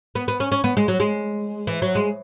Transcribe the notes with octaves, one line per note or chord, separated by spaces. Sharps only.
B3
B3
C#4
C#4
B3
G#3
F#3
G#3
E3
F#3
G#3